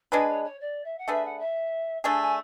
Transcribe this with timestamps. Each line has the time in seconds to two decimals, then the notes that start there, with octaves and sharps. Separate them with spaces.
0.12 G#3 D4 G#4 B4 G#5
0.28 C#5
0.44 C#5
0.60 D5
0.84 E5
0.98 F#5
1.08 A3 D4 G#4 B4 E5
1.25 F#5
1.39 E5
2.04 A3 D4 G#4 G#5
2.21 G#5